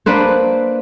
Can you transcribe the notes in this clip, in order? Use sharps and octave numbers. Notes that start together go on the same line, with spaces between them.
A#3 D4 B4 C5